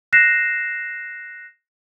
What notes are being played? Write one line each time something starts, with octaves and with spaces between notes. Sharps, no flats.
F#6 A#6 C7 E7